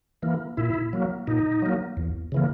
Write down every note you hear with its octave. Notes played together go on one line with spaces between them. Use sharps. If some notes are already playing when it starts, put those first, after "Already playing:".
E3 A#3
A#2 E4
F#3 A#3
A#2 D#4
F#3 A#3
E2
C#3 E3 A#3